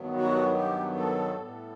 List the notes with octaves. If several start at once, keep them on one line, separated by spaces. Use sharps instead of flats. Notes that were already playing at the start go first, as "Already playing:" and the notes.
Already playing: G2 D#3 F#3 B3
F#4
G4
A4
A2 G3 B3